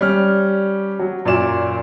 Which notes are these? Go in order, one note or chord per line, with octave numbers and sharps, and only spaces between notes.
G3 C#4 F6
F#3
F#2 A#2 D5 E7